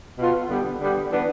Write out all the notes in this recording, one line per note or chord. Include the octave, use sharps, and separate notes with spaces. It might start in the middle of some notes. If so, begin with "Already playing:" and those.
B2 B3 F4 A4
D3 G3 B3
D3 G3 B3
E3 B3 D4